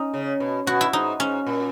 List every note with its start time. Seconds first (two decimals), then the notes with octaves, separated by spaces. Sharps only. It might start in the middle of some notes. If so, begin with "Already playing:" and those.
Already playing: C#4 D#4
0.14 C#3
0.40 B2
0.67 B2 F#4
0.81 E4
0.93 G#2 D#4
1.20 G#2 C#4
1.47 A#2